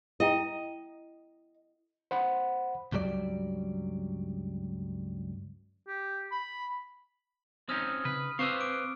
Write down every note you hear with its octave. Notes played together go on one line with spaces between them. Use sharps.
E4 D#5 G5 A#5
C5 F#5 B5
C#2 G2 F#3 G3 D5
G4
B5
C4 C#4 D#4 D#6 F6
C#3 B4
C4 B4 C5 F5 C#6 D6 E6
D6 D7